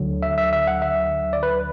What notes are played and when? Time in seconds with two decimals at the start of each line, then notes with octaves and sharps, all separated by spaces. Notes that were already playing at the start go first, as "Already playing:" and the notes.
Already playing: D2 D3 F#3
0.23 E5
0.38 E5
0.53 E5
0.67 F#5
0.82 E5
1.33 D5
1.43 B4